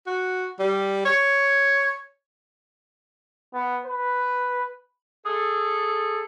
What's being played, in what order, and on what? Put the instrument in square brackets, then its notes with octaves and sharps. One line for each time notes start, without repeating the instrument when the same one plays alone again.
[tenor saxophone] F#4
G3
C#5
[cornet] B3
B4
[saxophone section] G#4 A4